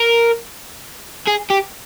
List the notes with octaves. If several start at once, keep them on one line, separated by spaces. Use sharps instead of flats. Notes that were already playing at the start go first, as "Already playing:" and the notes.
Already playing: A#4
G#4
G4